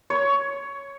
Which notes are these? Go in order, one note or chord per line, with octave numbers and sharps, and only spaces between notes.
C#5